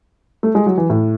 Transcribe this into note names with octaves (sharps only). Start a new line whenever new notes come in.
A3
G#3
F#3
E3
A2